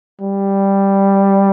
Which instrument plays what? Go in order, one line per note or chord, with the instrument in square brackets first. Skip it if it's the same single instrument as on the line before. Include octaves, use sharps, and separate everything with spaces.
[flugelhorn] G3